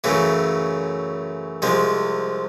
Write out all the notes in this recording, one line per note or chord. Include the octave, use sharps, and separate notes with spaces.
F#2 C#3 E3 A3
C2 C3 F3 G#3